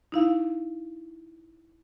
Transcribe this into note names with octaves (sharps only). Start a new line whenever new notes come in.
D#4 E4 F5